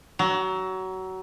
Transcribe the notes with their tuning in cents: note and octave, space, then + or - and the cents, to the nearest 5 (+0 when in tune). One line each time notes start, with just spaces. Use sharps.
F#3 +25